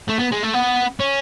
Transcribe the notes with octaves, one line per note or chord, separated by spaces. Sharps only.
A3
B3
G#3
A3
B3
C#4